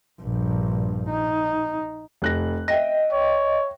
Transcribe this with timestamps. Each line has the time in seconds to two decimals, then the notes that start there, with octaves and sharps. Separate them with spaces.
0.22 A#1 G2
1.10 D#4
2.22 F1 F#6 A#6
2.68 D#5 E5 G5 A#6
3.12 C#5